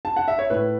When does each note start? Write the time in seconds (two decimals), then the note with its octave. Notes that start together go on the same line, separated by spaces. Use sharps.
0.05 A5
0.16 F#5
0.28 E5
0.39 C#5
0.50 A2 B4